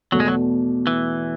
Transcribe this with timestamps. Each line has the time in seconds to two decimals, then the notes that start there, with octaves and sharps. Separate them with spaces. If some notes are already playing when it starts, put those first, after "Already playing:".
0.12 E2 B2 F#3 A3
0.20 G#3
0.28 F#3
0.87 E3